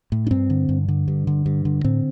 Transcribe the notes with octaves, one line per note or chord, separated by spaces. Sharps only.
A2
D4
G2 C4
D3
G2
D3
G2
D3
G2
D3
A2 C4